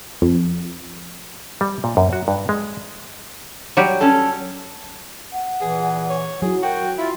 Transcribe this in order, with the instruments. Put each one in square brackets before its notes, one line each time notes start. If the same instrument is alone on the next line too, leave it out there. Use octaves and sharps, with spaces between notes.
[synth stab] F2
[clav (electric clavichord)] G3
A#2
F#2
F#4
G2
G#3
[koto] F#3 G3 G4
[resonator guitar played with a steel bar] C#4 A4
[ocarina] F#5
[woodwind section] E2 A#2 E3 [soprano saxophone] G#4
[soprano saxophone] C#5
[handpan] F#3 [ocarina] E4 [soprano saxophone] G#4
[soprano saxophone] F#4 [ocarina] A#4 [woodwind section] G5
[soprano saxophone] E4 [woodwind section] F4 [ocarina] E5